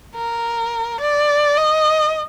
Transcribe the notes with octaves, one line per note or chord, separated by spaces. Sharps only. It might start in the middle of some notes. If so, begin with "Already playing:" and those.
A#4
D5
D#5